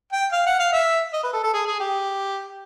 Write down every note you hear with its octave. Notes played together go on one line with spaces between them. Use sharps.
G5
F5
F#5
F5
E5
D#5
B4
A4
A4
G#4
G#4
G4